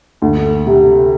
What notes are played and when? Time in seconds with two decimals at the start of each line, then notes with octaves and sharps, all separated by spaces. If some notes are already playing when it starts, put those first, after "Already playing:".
0.22 D2
0.67 C3